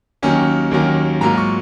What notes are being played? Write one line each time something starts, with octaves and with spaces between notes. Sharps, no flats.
D#2 D#3 F#3 A#3 C#4
D#2 D#3 F#3 A#3 C#4
G#2 F#3 A#3 F4 A#5
C#6